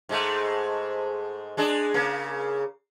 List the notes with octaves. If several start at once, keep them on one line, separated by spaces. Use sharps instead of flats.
G#2 G#3 A3
G#3 D4 G#4
C#3 A#3